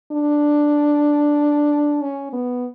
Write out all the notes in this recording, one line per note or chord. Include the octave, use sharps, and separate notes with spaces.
D4
C#4
B3